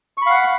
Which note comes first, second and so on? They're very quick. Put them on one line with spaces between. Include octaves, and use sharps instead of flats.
C#6 B5 F5 F#5